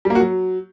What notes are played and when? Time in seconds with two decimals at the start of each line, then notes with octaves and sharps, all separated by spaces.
0.05 G3
0.10 A#3
0.15 F#4
0.20 F#3